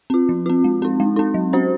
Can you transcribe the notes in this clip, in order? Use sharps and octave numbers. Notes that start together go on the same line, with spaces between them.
C4 F4
F3
C4 F4
G#3
C4 D#4
G#3
C4 D#4
F#3
C#4 F#4 C5